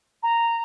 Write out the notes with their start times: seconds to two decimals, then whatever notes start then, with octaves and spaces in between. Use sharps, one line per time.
0.23 A#5